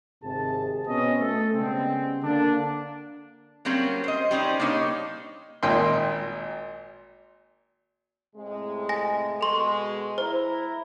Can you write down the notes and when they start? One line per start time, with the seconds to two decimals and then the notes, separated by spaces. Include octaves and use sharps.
0.24 G#1 G#2 C3 G#4 A5
0.87 B2 C4 C#4 B4 D#5
1.20 A3 A4
1.55 C#3 G3 G#3 B3 C4
2.23 D3 A#3 D4
3.65 F#3 G3 A#3 C4 C#4
4.04 C5 D#5
4.31 G3 C#4 D#4 C5
4.60 A#3 D4 D#4 C#5
5.63 G#1 A#2 D#5 G5 C6
8.36 A2 C3 G#3
8.89 G#5 A#6
9.41 B2 G#3 A4 C6 C#6
10.18 E4 C5 A#5